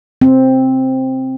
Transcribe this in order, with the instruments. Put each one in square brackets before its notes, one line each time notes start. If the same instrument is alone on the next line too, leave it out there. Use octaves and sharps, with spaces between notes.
[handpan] C4